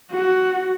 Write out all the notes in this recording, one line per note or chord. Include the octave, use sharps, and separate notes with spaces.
F#4